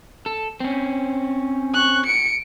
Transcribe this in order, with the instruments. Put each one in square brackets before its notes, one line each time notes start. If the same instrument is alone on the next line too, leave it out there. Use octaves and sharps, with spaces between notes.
[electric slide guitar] A4
C4 C#4
[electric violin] C#6 F#6
C#7 D7